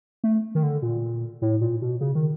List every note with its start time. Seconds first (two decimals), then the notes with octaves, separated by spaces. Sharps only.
0.24 A3
0.55 D#3
0.63 D3
0.82 A#2
1.42 A2
1.61 A#2
1.82 B2
2.01 C#3
2.15 D#3